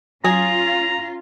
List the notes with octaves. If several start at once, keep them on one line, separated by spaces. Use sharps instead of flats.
F#3 C#4 F4 G#4 A#5